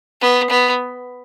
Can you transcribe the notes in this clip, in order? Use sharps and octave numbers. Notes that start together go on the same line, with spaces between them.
B3
B3